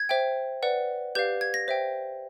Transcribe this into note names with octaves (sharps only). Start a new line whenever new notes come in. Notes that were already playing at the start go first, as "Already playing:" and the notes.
Already playing: G#6
C5 E5 G5
B4 D5 F#5
G4 B4 D5 F5 G6
G#6
A#6
C5 E5 G5